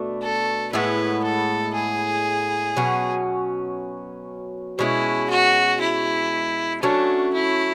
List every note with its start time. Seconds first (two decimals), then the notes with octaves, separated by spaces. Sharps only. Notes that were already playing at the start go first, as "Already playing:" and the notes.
Already playing: B2 A3 D4
0.22 A4
0.73 A2 G#3 B3 E4 B4
1.24 A4
1.74 G#4
2.77 B2 F#3 C#4
4.79 B2 G#3 C#4 E4
5.30 F#4
5.81 E4
6.83 F#3 A3 C#4 D4
7.34 E4